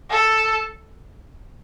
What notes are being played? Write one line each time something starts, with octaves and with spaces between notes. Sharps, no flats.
A4